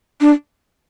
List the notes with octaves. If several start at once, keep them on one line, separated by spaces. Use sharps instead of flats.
D4